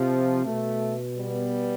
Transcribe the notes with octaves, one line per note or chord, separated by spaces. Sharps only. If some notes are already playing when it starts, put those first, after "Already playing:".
Already playing: C3 F3
B2 A3
G3 B3